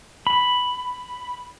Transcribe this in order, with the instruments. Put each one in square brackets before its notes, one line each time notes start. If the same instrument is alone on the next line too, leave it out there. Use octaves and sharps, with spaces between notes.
[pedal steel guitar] B5